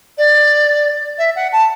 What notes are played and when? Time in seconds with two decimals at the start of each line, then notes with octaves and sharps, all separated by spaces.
0.18 D5
1.18 E5
1.36 F#5
1.53 A5